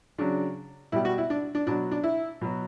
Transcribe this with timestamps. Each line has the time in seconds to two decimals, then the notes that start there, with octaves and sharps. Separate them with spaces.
0.18 C#3 F#3 D4
0.92 B2 G3 E4
1.05 F#4
1.18 E4
1.30 D4
1.55 D4
1.67 B2 F#3 D4
1.91 D4
2.04 E4
2.41 B2 F#3